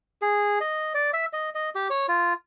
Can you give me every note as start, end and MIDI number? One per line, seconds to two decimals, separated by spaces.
0.22 0.59 68
0.61 0.93 75
0.94 1.10 74
1.13 1.25 76
1.33 1.50 75
1.55 1.70 75
1.75 1.88 67
1.90 2.07 73
2.08 2.33 65